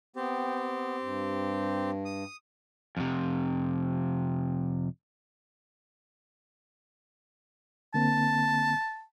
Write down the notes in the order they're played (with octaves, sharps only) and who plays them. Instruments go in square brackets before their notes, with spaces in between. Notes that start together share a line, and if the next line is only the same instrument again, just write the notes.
[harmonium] B3 [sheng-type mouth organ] C4 G4
[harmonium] G2
[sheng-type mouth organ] D#6
[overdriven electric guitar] F2 C3
[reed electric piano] D3 A#3 C4 [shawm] A5